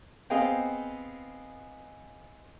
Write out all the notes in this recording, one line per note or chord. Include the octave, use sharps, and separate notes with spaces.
B3 C4 G#4 D#5 F5 G5